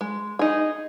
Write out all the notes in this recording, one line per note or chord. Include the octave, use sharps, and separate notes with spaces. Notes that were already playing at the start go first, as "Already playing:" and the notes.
G#3
D#4 G#4